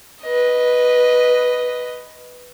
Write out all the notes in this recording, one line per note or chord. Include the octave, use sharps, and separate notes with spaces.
B4 D#5